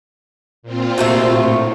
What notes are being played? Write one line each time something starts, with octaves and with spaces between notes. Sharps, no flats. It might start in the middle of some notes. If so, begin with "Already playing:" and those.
A#2 C4 F4
D2 C3 A3
A2